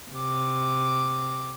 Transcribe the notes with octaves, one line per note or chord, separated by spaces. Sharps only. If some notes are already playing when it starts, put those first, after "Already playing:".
C3 D6